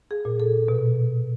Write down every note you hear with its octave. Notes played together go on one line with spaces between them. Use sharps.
G#4
A#2
A4
B2